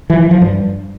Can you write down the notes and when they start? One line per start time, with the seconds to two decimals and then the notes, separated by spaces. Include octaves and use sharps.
0.10 E3
0.20 F3
0.31 F3
0.42 G2